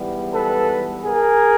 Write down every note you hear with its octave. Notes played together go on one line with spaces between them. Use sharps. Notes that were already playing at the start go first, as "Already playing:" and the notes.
Already playing: G#2 E3 G3 B3
A4 B4
G#4 A#4